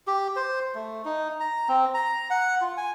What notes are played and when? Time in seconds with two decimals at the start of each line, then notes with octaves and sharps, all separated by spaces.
0.07 G4
0.36 C5
0.75 A3
1.05 D#4
1.40 A#5
1.68 C4
1.94 A#5
2.30 F#5
2.61 F4
2.77 G#5